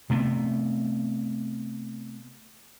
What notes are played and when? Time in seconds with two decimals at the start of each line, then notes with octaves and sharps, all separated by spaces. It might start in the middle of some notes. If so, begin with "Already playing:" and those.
0.10 C3 A3 B3